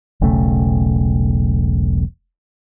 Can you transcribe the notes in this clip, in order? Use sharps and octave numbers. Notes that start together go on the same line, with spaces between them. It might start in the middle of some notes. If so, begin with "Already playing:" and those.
E1 B1 C#3 A3